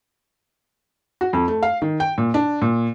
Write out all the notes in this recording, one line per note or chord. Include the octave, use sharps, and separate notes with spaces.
F#4
F2
A3
F5
D#3
G5
A#2
D4
A#2